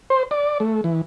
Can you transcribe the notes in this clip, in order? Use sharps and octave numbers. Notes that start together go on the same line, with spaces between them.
C5
D5
A3
E3